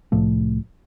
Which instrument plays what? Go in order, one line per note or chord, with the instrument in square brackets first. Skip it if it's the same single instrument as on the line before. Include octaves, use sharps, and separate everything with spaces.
[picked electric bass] C2 A2 F3 A3